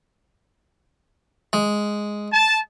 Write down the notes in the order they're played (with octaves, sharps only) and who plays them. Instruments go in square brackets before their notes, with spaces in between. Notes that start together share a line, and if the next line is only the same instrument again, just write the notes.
[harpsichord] G#3
[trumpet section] A5